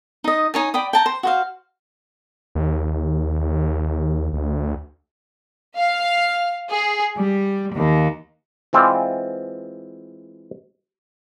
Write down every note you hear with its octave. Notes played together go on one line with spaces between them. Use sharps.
D#4 D#5
D#4 C#5 G#5
D5 G5 B5 D#6
G5 A5 A#5
C5
F#4 C5 F5
D#2
D2
F5
G#4
G3
D#2
E3 G#3 C4 F4 D5